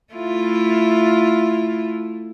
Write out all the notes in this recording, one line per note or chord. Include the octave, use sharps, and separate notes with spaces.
A3 E4 F4